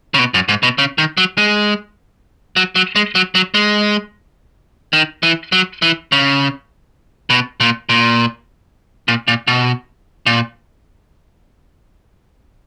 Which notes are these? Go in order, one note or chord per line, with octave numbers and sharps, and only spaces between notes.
C#3
B2
F#2
G#2
B2
C#3
D#3
F#3
G#3
F#3
F#3
G#3
F#3
F#3
G#3
D#3
E3
F#3
E3
C#3
B2
A#2
A#2
A#2
A#2
B2
A#2